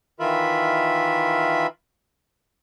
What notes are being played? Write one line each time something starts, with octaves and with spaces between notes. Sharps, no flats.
D#3 E3 F4 A#4 E5 B5